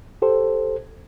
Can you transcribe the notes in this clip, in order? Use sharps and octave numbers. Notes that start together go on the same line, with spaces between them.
G4 A4 C5